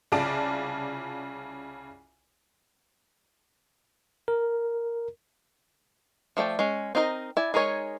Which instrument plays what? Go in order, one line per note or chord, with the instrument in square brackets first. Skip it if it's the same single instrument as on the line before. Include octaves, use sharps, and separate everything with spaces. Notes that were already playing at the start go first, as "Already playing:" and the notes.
[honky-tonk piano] C2 C#3 F4 D5 A5 D7
[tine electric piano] A#4
[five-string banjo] F3 A3 D5 G5
G#3 C#4
C4 D#4 A#4 B4 D#5
E4 D5 G#5
G#3 D#4 A#4 C#5 G#5